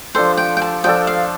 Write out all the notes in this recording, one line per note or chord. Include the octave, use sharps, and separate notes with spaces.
F3 D4 A4 C5
G5
G5
A5
F3 D4 A4 G5
F5